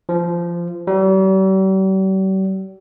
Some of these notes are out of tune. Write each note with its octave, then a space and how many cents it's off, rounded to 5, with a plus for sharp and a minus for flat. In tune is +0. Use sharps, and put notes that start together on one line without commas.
F3 -20
G3 -45